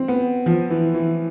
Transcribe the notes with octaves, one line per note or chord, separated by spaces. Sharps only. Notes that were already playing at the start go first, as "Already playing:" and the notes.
Already playing: C4
B3
F3
E3
E3